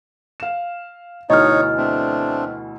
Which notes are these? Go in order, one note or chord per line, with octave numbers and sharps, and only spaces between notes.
F5 E7
D2 B2 E3 D#4 C#5 D#5 F6
A3 C4 D4